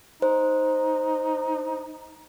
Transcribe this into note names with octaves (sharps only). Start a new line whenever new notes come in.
D#4 C5